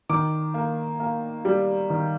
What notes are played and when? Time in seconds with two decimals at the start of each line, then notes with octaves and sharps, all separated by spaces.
0.09 D#3 D6
0.54 A#3
1.00 A#3
1.45 G3
1.90 D#3